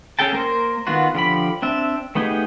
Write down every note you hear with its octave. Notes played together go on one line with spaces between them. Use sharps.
C#4 G#4 A4 G5 A5
A#3 A#4 C5
D#3 B3 F4 F#4
D3 F3 G4 B5
C4 D4 E5
A3 B3 D#4 G4 G#4